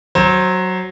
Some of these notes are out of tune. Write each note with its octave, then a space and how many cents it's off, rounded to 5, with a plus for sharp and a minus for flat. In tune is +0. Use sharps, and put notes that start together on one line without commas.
F#3 +5 C5 +30